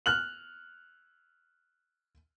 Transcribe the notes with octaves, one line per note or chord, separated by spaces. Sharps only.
F6 F#6 F#7